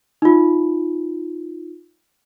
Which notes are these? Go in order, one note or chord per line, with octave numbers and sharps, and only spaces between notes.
D#4 F4